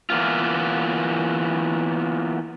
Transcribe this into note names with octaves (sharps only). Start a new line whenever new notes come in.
E3 A#3 B3 F4